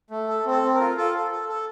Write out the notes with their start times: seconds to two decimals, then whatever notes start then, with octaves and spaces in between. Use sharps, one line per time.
0.10 A3
0.28 A4
0.46 C4
0.51 A4
0.63 C4
0.74 A#4
0.81 F4
0.97 F4 A4
1.15 A4
1.31 A4
1.49 A4